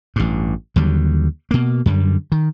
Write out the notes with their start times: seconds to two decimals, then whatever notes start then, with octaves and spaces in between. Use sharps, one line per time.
0.16 A1 G2
0.76 D#2 D3 F#3 G3
1.51 B2 A#3
1.86 F#2 D3 G3
2.32 D#3